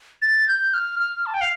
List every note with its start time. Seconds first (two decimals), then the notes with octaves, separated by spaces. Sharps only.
0.22 A6
0.48 G6
0.74 F6
1.00 F6
1.26 A5
1.34 G5
1.41 F5